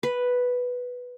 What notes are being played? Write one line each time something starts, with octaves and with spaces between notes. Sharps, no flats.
B4